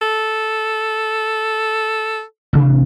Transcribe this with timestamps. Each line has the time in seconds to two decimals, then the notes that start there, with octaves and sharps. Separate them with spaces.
0.02 A4
2.53 A1 C3 D4